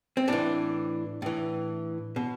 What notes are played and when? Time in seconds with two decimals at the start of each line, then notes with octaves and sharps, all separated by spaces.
0.17 C4
0.28 A2 E3 D4
1.22 A2 E3
2.16 B2